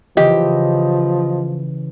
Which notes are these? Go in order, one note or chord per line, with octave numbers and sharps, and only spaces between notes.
C#3 E3 F3 G4 D#5